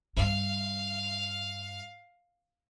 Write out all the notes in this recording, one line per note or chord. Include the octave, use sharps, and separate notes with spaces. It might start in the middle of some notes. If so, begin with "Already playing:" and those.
G2 F5